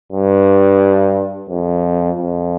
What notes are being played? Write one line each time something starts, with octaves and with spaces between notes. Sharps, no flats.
G2
F2
F2